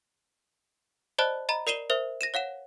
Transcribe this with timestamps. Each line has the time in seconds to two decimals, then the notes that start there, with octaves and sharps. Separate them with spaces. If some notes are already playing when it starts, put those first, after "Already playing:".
1.19 C5 D5 D#5 A5 B5 F#6
1.49 D#5 A#5 B5
1.67 A#4 D5 C7 D#7 E7 G7
1.90 A#4 C5 E5
2.21 A#6 D#7 E7
2.34 C#5 F5 F#5 E7